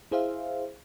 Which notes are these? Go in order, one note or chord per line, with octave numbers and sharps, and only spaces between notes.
E4 G#4 C5 E5 F5